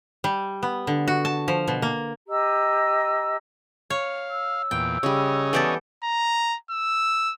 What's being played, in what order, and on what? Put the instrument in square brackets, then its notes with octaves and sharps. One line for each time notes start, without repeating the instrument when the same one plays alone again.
[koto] G3
B3
D3
F#4
A5
F3
B2
A#3
[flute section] G4 D#5 A#5 E6
[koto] C#5 [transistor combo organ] F5
[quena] E6
[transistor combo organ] E2 A#2 [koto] G5
[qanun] C#3 G3 [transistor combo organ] C#4 C#5 D#5
[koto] E3 G4 A4 [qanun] B3 D5
[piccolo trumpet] A#5
E6